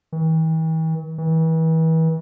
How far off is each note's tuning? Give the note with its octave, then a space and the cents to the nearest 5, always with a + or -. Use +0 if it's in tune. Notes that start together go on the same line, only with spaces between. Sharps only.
E3 -45
E3 -35